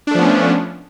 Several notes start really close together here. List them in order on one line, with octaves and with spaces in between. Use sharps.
D4 A3 F3 B3 C#4